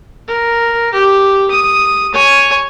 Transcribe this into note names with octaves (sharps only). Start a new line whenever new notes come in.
A#4
G4
D#6
C#5 G#5